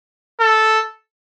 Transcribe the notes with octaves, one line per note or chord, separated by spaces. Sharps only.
A4